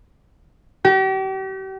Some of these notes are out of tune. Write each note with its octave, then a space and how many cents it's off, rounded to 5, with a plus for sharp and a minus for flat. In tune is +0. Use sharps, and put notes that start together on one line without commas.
G4 -40